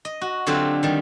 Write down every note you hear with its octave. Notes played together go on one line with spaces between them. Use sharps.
D#5
F#4
D3 F#3 C4 F4 G4
D#3 G3